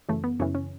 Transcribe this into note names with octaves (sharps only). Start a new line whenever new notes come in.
F#2 C#3 E3 A3
B3
F#2 C#3 E3 C#4
C#4